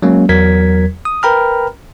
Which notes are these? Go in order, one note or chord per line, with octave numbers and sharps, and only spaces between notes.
F#3 G#3 A#3 C#4
E2 F#3 A#4 G#6 B6
D#6
A#4 B4 G5 A#5 B5 F6